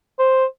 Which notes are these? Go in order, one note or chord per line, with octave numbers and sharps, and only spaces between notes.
C5